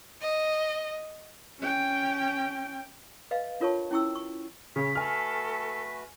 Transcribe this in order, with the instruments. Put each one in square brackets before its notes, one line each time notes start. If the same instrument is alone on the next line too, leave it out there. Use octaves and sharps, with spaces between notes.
[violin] D#5
[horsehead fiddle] C#4 G5
[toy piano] B4 D#5 F5
D4 F4 A#4 C#5 A5 C#6
C#4 E4 G5 C#6 E6
C#6
[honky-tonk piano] C#3 [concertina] C#4 C#5 [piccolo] B6
[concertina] A3 F#4 B4 [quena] A4 [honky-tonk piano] G#5 F6
[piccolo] B6